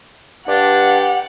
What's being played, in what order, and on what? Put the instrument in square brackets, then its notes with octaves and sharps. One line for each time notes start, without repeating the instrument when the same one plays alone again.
[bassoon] G2 [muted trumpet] D4 [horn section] G4 [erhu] F#5